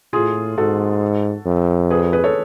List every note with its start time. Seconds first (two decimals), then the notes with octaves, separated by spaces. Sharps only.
0.13 A2 F4 G#4
0.58 G#2 F#4 A4
1.46 F2
1.91 G#4 B4
2.13 G#4 B4
2.24 A4 C#5